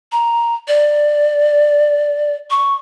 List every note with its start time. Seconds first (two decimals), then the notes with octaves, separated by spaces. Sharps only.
0.12 A#5
0.68 D5
2.50 C#6